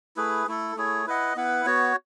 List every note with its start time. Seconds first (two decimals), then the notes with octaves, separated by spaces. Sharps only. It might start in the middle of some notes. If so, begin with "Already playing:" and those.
0.16 A3 E4 G#4 B4
0.47 A3 E4 A4
0.76 A3 E4 G#4 C#5
1.06 E4 B4 D#5 F#5
1.36 B3 E4 B4 F#5
1.66 B3 F#4 C#5